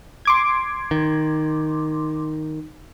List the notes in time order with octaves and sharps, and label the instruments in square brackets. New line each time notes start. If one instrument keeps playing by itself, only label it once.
[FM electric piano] C6 D6 G#6
[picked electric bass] D#3